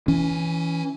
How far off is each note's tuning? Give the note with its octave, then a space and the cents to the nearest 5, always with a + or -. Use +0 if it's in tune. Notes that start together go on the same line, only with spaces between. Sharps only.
E3 +0 C#4 +20